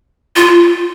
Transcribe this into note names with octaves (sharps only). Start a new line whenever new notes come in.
F4